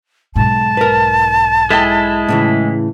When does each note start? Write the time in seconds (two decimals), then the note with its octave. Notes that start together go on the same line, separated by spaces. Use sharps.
0.36 B1 G#2 A5
0.77 A#4 B4
1.70 G#3 E4 A4 G5
2.29 A2 C#3 E3